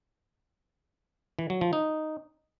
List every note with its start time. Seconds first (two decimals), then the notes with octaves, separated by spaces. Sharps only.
1.39 E3
1.50 F#3
1.61 F3
1.73 D#4